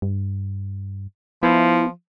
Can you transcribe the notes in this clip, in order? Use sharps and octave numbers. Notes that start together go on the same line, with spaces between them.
G2
F3 B3 E4